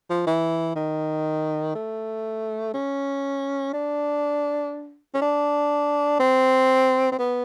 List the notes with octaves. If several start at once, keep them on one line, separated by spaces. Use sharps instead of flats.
F3
E3
D#3
A3
C#4
D4
C#4
D4
C4
C4
B3